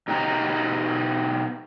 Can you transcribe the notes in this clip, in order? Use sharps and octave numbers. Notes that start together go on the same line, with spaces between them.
B2 D#4 G4 D#5 A#5